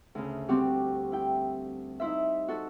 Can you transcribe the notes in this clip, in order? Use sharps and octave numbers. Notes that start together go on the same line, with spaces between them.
D2 C#3
G3 C4 F#4 G4
E4 G5
D#4 E4 C5 E5
F#4 A4